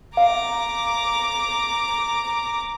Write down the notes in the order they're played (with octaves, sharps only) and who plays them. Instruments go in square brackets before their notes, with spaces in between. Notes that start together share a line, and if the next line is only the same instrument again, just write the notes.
[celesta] F5 [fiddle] A#5 D6